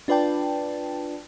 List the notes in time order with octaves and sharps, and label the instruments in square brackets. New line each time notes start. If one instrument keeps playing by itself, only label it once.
[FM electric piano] D4 F4 B4 D5 G5 A5